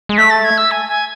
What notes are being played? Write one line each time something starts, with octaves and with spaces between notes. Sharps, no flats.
G#3
A3 B6
A6
G#6
E6
G#5
G#5